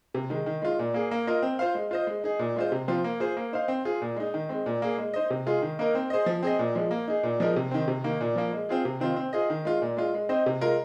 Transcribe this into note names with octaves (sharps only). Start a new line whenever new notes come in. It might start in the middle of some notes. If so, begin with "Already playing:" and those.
C3
D#3 G#3
D#3
G#3 F4
A#2
A#3 G#4
A#3
F4 A#4 D#5
C4
F4 C5 F5
G#3
F4 C5 D#5
G#3
D#4 G#4
A#2
G#3 F4 C5
C3
F3 C4 F4
A#3
F4 G#4 C5
A#3
D#4 C5 F5
C4
F4 G#4
A#2
G#3 D#4
D#3
G#3 C4
A#2
A#3 G#4
G#3
D#4 C5 D#5
C3
G#3 F4 G#4
D#3
A#3 D#4 A#4
C4
G#4 C5 D#5
F3
C4 G#4 D#5
A#2
F3 G#3
A#3
D#4 G#4
A#2
F3 G#3 D#4 A#4
C3
D#3 C4
C3
D#3 A#3
A#2
F3 A#3
G#3
C4 F4 G#4
C3
D#3 C4 F4
C4
F4 G#4 D#5
D#3
G#3 F4
A#2
G#3 F4
G#3
C4 D#4 C5 D#5
C3
G#3 F4 A#4